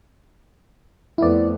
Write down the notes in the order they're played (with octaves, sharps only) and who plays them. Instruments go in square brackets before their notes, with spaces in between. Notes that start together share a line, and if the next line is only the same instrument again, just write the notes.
[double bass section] F2 A3 B3 [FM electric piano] E4 D5